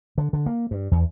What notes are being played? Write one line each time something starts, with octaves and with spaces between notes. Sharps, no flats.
D3
D3
A#3
G2
E2